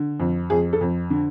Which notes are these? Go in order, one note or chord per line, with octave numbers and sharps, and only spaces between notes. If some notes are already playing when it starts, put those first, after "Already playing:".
Already playing: D3
F2
F2 G#4
A4
F2
D3